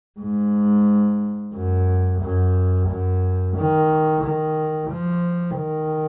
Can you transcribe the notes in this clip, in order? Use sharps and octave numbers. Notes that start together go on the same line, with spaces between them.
G#2
F#2
F#2
F#2
D#3
D#3
F3
D#3